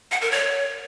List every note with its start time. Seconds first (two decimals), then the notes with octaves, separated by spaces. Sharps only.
0.11 F#5
0.21 A#4
0.31 C#5